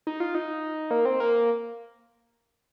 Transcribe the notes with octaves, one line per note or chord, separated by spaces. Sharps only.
D#4
F4
D#4
A#3
C4
A#3